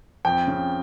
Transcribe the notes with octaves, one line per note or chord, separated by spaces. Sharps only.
F2 G5
C#3